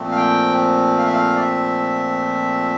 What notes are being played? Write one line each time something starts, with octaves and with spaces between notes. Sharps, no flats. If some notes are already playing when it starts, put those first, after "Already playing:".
Already playing: A#2 F3 A3 C4
F5
G5
F5
E5
F5
D5
E5